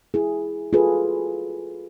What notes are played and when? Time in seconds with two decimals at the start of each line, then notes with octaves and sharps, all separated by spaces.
0.14 E4 G#4
0.73 F4 F#4 G#4 A4 B4